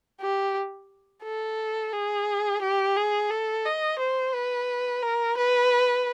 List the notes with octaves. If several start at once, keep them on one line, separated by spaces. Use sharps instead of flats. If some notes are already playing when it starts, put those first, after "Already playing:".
G4
A4
G#4
G4
G#4
A4
D#5
C5
B4
A#4
B4